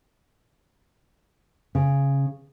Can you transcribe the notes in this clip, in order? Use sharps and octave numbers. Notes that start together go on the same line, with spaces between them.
C#3